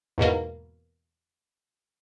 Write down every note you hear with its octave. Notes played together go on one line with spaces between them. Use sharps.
E2 G#2 B2 A#3